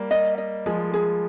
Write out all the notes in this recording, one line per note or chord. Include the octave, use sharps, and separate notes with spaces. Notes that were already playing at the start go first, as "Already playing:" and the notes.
Already playing: G3 A#3
D#5
D#5
F3 G#3 G#4
G#4